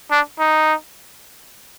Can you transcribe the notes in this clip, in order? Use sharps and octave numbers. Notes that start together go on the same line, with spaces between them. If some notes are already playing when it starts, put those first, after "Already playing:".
D4
D#4